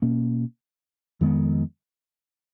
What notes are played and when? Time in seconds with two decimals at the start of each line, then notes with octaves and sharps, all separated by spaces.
0.02 B2 A#3 C#4
1.21 F2 D#3 G#3 B3